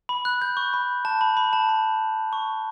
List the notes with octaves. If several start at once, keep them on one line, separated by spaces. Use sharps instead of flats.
B5
F#6
G6
C#6
B5
A5
B5
B5
A5
B5
C#6